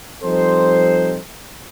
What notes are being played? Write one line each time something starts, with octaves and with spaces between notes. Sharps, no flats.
F3 G3 C4 D#4 A4 C5